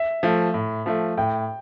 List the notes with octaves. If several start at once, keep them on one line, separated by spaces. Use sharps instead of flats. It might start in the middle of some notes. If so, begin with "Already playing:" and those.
Already playing: E5
F3 A3
A2
F3 A3
A2 G5